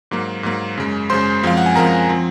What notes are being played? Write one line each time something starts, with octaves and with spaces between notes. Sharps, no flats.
G#2 F#3 A#3
G#2 F#3 A#3
F#2 C#3 G#3
F#2 C#3 G#3 C5 C6
F#2 F3 G#3 C4 F5
F#5
G#5
F#2 F3 G#3 C4 A#4 A#5
F3 C4